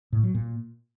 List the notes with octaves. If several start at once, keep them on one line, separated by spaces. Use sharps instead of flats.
A2
F#3
A#2